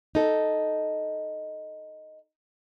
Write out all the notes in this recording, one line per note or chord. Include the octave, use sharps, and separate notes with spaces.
D#4 A4